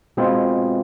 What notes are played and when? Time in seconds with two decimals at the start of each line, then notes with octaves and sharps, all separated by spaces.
0.17 B2 G#3 C4 F4